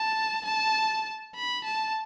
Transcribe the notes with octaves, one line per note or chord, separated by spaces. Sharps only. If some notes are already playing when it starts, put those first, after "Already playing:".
Already playing: A5
A5
B5
A5